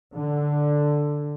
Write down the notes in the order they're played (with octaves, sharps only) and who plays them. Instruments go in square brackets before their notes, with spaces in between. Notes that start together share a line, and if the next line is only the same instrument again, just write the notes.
[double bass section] D3